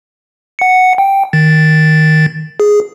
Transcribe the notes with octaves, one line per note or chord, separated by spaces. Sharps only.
F#5 C#7
G5
D#3 A6
G#4